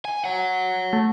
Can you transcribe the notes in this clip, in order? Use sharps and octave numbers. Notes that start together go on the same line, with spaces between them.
G#5
C#5 F#5
A3